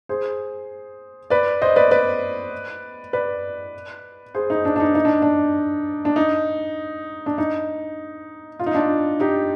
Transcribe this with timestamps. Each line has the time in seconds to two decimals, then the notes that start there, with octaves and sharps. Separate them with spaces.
0.09 G#4 C5
1.30 B4 D5
1.62 C5 D#5
1.76 B4 D5
1.91 B4 D5
3.13 B4 D5
4.35 G#4 C5
4.50 D#4
4.65 D4
4.76 D4
4.80 D#4
4.95 D#4
5.05 D4
5.22 D4
6.05 D4
6.16 D#4
7.26 D4
7.38 D#4
8.60 F4
8.66 D#4
8.74 D4 F4
9.20 D#4 G4